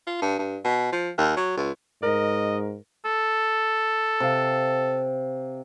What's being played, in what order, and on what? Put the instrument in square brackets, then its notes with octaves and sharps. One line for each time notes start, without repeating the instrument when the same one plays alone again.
[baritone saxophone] F4
G2
G2
B2
F3
D#2
F#3
C#2
[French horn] G#2 [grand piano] A#4 [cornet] D#5
[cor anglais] A4
[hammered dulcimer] C3 F5